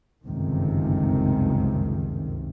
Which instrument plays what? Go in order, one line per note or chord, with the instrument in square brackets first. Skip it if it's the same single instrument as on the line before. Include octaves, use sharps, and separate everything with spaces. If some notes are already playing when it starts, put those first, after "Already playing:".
[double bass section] G1 C#2 F#2 C3 D#3